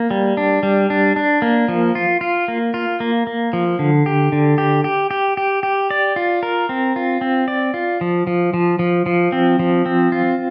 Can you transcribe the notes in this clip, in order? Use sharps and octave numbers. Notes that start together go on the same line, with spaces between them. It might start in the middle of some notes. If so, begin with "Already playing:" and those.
Already playing: A#3
G3
D4
G3
D4
D4
A#3
F3
F4
F4
A#3
F4
A#3
A#3
F3
D3
G4
D3
G4
G4
G4
G4
G4
D5
F4
A#4
C4
F4
C4
D5
F4
F3
F3
F3
F3
F3
C4
F3
C4
F4